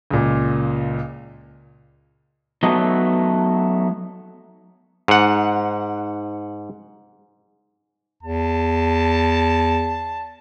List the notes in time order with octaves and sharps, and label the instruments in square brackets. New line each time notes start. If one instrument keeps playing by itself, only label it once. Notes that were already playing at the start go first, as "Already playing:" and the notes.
[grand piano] C#2 A#2
[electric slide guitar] F#3 A3 B3 D#4
[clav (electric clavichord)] G#2 F#5
[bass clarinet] E2 [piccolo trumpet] A5